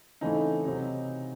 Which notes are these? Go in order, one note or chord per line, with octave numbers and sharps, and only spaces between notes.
C#3 E3 A3 C4 D#4
C3 F#3 C4